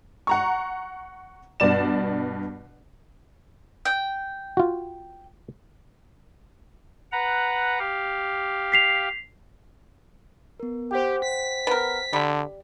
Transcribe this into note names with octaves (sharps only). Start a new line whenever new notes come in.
F#5 A#5 C#6
G2 B2 D5 E7
G5
F4 F#4
B4 F#5 A#5
G4 F5
B6 C7 F7
B3 A#4
G4 C5 F#5 G5
B6
B3 A#4
D3 G3